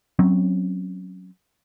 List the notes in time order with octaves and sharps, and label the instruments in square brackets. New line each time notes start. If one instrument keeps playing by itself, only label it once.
[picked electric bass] F#3 C4 C#4